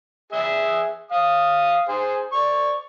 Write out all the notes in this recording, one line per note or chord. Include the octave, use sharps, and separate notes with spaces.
G#4 E5
F5 D#6
G#4 C5
D5 C#6